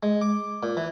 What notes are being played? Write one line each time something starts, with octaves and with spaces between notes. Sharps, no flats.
G#3
D6
A#2
E3